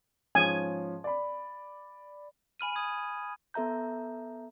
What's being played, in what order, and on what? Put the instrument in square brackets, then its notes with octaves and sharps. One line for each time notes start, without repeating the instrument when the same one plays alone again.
[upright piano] G#2 F3 C#4 [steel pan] G#5
[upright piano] D5 B5
[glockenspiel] G#5 B5 F6 D#7
D#6 G#6
[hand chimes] B3 A4 E5 A#5 G6